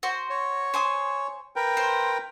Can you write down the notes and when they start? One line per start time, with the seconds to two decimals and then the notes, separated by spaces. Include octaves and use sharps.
0.03 F#4 C5
0.30 C#5
0.74 C5 G#5 D#6
1.56 A#4 B4 G5
1.77 C5